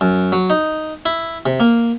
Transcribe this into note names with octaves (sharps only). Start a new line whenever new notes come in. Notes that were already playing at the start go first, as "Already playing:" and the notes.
F#2
F#3
D#4
E4
C3
A#3